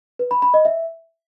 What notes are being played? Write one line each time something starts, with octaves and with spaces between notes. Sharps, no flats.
B4
B5
B5
D#5
E5